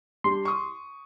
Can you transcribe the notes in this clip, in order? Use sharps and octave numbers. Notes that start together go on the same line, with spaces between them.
G3 D4 G4 C6
C#6 D#6